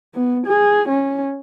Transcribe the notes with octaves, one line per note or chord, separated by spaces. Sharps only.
B3
G#4
C#4